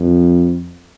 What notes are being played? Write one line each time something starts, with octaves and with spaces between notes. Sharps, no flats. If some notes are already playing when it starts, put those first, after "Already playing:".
Already playing: F2